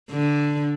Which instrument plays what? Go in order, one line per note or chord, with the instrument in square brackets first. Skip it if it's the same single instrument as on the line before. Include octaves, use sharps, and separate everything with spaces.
[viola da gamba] D3